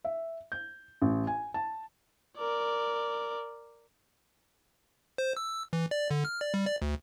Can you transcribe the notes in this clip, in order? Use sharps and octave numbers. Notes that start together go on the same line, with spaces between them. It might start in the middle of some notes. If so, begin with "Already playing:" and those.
E5
G6
A1
G#5
A5
A#4 D5
C5
E6
E3
D5
D3
F6
D5
G3
D5
D2